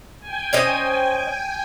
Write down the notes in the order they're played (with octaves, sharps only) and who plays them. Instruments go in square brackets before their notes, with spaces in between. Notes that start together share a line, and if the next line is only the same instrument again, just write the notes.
[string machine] G5 G#5
[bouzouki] C#4 C5 D#5